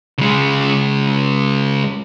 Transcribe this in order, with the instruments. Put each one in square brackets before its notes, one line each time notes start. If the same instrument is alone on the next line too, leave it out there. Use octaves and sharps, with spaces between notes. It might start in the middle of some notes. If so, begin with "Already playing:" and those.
[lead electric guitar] C#3 G#3